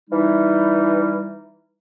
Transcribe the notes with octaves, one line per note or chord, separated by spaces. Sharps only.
E3 G3 D#4